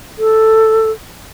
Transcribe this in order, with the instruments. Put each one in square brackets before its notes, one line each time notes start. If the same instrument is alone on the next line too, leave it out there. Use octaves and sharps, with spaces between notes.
[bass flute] A4